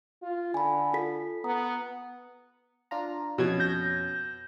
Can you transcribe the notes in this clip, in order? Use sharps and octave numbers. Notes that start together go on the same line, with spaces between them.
F4
D3 G#5 B5
F4 A4 B6
B3 A#5 D#6
D4 F4 A#5
F2 B2 C#4 G#6
G6 A#6